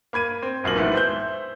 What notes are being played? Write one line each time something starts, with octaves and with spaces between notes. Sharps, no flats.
A#3 B5 G#6 D#7
C4
A#1 F#2 A#3 F#7
A2 D#3 E3 G#3 A3 B3
C5 E5 G6